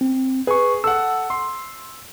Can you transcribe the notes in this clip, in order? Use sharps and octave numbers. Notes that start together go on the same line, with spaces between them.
C4
G#4 B4 C#6
A4 F#5 E6
C6